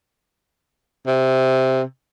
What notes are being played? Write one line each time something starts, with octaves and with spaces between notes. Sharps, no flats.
C3